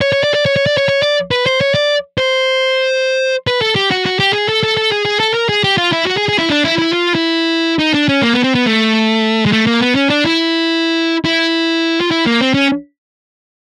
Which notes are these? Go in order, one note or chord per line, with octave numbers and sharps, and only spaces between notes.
C#5
C#5
D5
D5
C#5
C#5
D5
C#5
C#5
D5
B4
C5
C#5
D5
C5
B4
A4
G4
F#4
F#4
G4
G#4
A4
A4
A4
G#4
G#4
A4
A#4
G#4
G4
F4
E4
F#4
G#4
G#4
E4
D4
E4
E4
F4
E4
D#4
D4
C#4
A#3
B3
C4
B3
A3
G#3
A3
A#3
B3
C#4
D4
E4
E4
F4
E4
A#3
C4
C#4